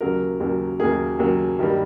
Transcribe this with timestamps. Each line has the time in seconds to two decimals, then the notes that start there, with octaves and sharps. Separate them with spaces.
0.01 D#2 C#3 F#3 A#3 A#4
0.40 D#2 C#3 F#3 A#3
0.80 D#2 C#3 F#3 A#3 G#4
1.19 D#2 C#3 F#3 A#3
1.59 G2 D#3 G3 A#3